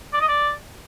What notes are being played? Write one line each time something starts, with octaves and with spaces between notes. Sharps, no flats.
D5
D#5
D5